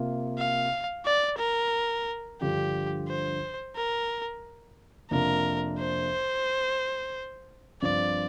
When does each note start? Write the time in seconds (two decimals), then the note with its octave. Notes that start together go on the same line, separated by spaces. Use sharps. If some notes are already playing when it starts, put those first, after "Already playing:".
Already playing: C3 A#3 F4
0.38 F5
1.06 D5
1.39 A#4
2.41 G2 D3 F3 D4 F4 G4
3.08 C5
3.76 A#4
5.11 F2 C3 A#3 D4 F4 A#4
5.79 C5
7.82 G2 F3 C4 F4 D5